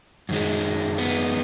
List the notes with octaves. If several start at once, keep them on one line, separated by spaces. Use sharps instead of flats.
F#2 D#3 G#3
B3